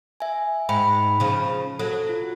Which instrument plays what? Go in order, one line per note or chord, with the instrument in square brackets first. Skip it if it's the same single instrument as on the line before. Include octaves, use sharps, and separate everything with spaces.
[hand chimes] E5 G#5
[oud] G#2 [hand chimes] G5 B5
[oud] C#3 F3
[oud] F#3 [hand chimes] A4
[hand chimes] F4